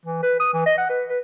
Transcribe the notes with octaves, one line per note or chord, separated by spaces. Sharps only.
E3
B4
D#6
E3
D#5
F#5
B4
B4